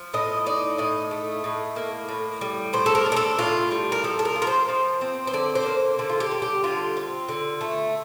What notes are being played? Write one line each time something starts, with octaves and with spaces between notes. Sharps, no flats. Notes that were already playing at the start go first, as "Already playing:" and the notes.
Already playing: F3
A2 D#5
D#4 D5
A2 D#5
A3
A2
A#3
A2
G3
A2 C5
A4
A#4
D4
A#4
A4
A2 F4
G3
A#4
F3 A4
A4
A#4
F4
A#4
C5
F3
C4
C5
D3 D5
C5
A#3
D3 A4
F4
G4
G3
G4
D3 F4
C4
D3
A3